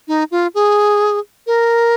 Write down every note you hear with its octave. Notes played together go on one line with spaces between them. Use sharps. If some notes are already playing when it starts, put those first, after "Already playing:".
D#4
F4
G#4
A#4